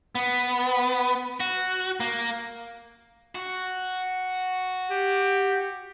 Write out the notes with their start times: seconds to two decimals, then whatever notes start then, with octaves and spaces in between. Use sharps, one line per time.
0.15 B3
1.40 F#4
2.00 A#3
3.35 F#4
4.90 G4